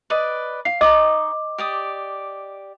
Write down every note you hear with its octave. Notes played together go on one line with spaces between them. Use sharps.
B4 D5 D#5
F5 C7
D#4 D#5 D6 D#6
G4 D5 D#6